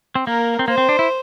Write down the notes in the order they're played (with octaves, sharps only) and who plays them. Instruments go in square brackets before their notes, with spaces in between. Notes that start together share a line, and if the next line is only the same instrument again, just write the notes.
[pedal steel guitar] C4
[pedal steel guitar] A#3 [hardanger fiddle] A#4
[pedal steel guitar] C4
[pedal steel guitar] A#3 [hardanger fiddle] C5
[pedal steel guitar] C4
D4
E4